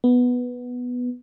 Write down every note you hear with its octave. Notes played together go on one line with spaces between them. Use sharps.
B3